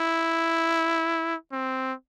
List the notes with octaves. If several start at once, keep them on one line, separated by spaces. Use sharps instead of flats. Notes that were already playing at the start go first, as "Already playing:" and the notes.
Already playing: E4
C4